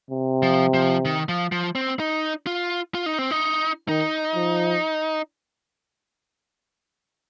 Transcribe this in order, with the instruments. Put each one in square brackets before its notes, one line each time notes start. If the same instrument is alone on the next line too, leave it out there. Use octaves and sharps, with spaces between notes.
[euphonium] C3
[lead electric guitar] F3
F3
D#3
F3
F3
C4
D#4
F4
F4
D#4
C4
D#4
[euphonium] D#3 [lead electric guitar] D#4
[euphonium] F3